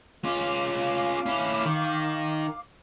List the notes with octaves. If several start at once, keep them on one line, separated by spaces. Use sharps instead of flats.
C#4 F4 F5 D6
C#4 E4
D#3